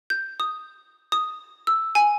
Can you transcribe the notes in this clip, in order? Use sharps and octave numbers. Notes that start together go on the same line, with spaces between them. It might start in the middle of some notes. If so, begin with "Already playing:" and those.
G6
D#6
D#6
E6
G#5